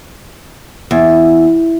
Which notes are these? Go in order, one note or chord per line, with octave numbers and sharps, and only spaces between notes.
E2